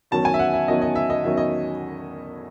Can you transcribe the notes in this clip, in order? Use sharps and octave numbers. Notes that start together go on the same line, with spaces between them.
E2 D#3 F#3 C#4 A5
G#5
E5
F#5
E5
E2 D#3 F#3 C#4 D#5
D#5
E5
D#5
E2 D#3 F#3 C#4 E5
D#5